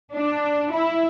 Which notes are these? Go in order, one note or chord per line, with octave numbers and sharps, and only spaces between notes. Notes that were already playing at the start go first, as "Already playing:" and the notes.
D4
E4